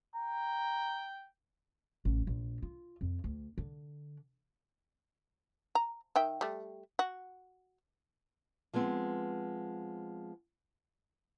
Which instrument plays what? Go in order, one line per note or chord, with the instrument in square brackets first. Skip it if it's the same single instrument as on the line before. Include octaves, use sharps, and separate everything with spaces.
[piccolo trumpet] G5 [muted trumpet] A#5
[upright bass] A1
A#1
F4
F2
D2
D3
[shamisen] A#5
D#3 E5 G5
G3 A3
F#4
[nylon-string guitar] F3 G#3 B3 C4